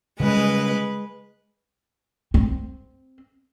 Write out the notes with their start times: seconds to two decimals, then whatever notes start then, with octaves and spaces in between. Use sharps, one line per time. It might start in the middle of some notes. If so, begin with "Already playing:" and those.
0.20 C#3 G3 G#3 C#4 B4
2.34 C4